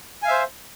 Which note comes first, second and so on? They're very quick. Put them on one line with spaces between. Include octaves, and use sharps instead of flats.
G#5 F5 E5 C5